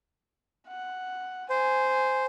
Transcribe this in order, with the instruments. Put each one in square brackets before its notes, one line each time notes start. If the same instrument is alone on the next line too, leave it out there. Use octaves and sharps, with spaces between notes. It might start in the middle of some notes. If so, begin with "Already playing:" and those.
[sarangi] F#5
[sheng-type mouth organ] C5 [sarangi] G#5